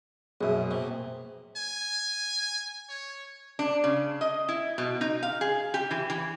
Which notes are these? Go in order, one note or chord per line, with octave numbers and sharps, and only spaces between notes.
A#1 F#2 B2 G#4 E5
A#1 C3
G#5
C#5
D4
C#3
D#5
E4
B2
D#4
F5
G#4
G4
E3
E3